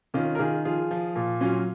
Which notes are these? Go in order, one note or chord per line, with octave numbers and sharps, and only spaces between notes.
D#3 C#4 F4
A#4
D#3 F4 G#4
F3 F4 G#4
F3
A#2
F#3 C#4 F4